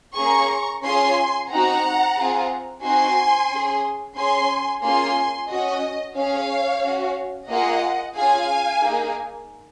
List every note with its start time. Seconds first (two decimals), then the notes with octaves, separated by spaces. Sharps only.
0.17 A#3 C#4 G#4 A#5 C#6
0.83 C#4 F4 G#4 G#5 C6
1.51 C4 D#4 F#4 F#5 A#5
2.17 C4 F4 G#4
2.83 C4 D#4 F#4 G#5 C6
3.50 C#4 G#4
4.17 C#4 G#4 G#5 C6
4.83 A#3 C#4 F4 G#4 G#5 C6
5.50 C#4 F#4 D#5
6.16 C#4 G#4 C#5 F5
6.83 C#4 F#4
7.49 A#3 F4 G#4 D#5 F#5
8.16 C#4 F4 G#4 F5 G#5
8.83 A#3 D#4 G#4